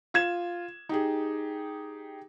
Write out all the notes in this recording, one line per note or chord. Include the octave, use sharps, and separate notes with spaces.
F4 G#6 E7
D#4 G4 G#4